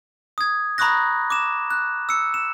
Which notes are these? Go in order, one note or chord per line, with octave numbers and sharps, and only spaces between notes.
D#6 G#6
A#5 B5 C#6 D#6 F#6 A#6
D6 E7
F#6
E6 C#7
E7